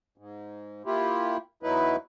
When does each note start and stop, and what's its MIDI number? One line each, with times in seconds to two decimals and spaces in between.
0.18 0.83 44
0.86 1.37 58
0.86 1.37 64
0.86 1.37 65
0.86 1.37 67
1.63 1.96 40
1.63 1.96 54
1.63 1.96 63
1.63 1.96 64
1.63 1.96 71